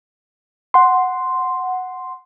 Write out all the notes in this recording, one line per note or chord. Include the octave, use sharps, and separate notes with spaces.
F#5 C6